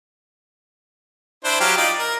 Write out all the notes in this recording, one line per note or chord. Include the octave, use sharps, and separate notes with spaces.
D4 E4 C5
F#3 G4 F5
D#4 F4 D5
A#4